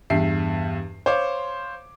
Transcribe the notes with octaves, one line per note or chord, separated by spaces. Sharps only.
E2 G2 E5 C7
C5 C#5 F5 D6